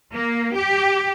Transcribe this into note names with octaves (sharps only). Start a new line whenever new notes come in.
A#3
G4